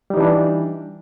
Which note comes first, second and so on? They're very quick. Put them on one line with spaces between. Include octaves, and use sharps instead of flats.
G3 D#4 E3 D4